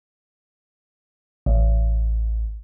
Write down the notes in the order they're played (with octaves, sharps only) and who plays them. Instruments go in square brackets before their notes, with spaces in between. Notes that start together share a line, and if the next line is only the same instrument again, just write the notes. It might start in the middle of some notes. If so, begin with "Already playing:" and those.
[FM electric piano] A1